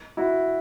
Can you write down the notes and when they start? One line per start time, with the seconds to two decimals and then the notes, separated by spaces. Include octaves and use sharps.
0.17 E4 F#4